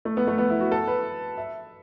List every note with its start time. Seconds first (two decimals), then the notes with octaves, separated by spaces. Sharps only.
0.05 A3
0.17 B3
0.27 A3
0.38 B3
0.49 E4
0.60 F#4
0.72 A4
0.87 B4
1.38 E5